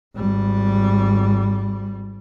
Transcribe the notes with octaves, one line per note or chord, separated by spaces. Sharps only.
G#1 G3